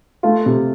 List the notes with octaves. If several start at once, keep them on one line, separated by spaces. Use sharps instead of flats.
A3 F4
C3